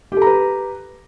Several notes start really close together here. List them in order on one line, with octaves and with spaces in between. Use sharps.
G4 A4 A#5 B4